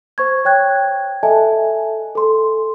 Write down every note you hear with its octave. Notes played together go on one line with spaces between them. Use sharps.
C5 C#6 G#6
C#5 G5 F#6 G#6
A4 D#5 E5 G#5 A5
A4 C6